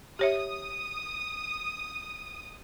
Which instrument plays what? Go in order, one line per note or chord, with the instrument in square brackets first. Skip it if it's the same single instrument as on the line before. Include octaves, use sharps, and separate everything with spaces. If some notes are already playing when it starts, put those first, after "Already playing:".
[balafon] G4 C#5 E5 [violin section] D#6